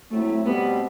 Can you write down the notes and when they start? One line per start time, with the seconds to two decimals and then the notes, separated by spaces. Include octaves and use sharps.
0.11 A2 F#3 A3 C4 E4
0.45 B2 G3 B3 C4